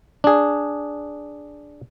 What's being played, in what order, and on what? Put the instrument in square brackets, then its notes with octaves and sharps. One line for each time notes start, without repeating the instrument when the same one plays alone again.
[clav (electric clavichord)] D4 G#4